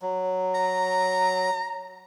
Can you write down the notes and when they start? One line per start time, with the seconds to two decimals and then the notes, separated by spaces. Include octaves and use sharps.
0.02 F#3
0.55 A#5